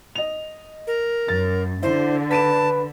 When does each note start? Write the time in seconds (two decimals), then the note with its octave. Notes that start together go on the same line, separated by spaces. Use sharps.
0.15 D#5 F7
0.87 A#4
1.28 F#2 A6
1.83 D3 E4 C5
2.31 B4 A5 B6 D7 E7